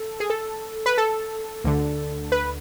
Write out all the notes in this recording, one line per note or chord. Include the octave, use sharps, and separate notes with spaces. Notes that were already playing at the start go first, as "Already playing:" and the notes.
Already playing: A4
G#4
A4
B4
A4
D2 D3
B4